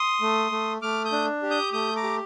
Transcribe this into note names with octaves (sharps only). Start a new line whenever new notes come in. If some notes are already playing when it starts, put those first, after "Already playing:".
Already playing: C6 D#6
A3
A3
A3 D6 F6
D#6 G6
D4
G4
D#6 G6
A3 D#6 G6
A#5 D6
G4